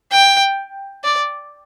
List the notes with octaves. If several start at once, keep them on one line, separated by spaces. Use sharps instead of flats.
G5
D5